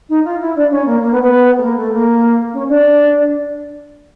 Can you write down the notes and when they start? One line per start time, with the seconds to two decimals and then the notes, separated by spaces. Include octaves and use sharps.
0.09 D#4
0.24 F4
0.40 E4
0.56 D4
0.70 C#4
0.86 A#3
1.01 A#3
1.11 B3
1.21 B3
1.58 A3
1.62 A#3
1.77 A3
1.92 A#3
2.53 C#4
2.68 D4